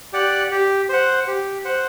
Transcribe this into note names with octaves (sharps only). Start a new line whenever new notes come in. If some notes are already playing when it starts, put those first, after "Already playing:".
G4 D5 F#5
G4
C5 F#5
G4
C5 F#5